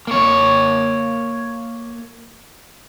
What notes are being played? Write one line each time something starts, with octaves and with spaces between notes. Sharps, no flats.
A#3 C#5